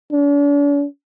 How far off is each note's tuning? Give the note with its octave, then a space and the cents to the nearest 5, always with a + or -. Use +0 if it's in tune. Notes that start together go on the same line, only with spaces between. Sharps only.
D4 -45